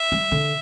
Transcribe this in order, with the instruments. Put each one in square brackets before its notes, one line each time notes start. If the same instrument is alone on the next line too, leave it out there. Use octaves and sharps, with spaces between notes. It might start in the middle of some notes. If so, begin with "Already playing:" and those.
Already playing: [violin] E5
[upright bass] G3
D3